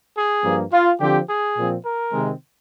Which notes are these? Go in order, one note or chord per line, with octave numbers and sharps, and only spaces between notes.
G#4
G2 F3 A#3
F4
D3 F3 C4 G4
G#4
A#2 F3 C4
A#4
C3 D#3 G#3 C4